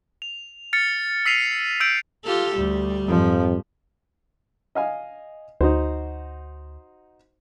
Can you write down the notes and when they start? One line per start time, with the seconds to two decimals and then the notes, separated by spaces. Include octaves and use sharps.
0.22 F7
0.73 F6 A6 C#7
1.26 E6 B6 C7 D#7 F7
1.80 E6 G6 D7 F7
2.25 F4 G4 A4
2.56 D2 G3
3.08 F2 G#2 F3
4.75 D#5 F5 G#5
5.61 D2 D#4 F#4 C5